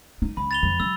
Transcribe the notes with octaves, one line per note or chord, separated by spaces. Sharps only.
D#4
C#2 B5
A6 F7 G7
F2
F#3 E6